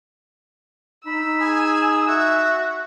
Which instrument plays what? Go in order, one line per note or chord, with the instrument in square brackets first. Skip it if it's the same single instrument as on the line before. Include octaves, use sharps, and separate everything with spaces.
[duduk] D#4 [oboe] B5 [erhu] E6
[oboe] G#4 [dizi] G#5
[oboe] F#4 [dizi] E5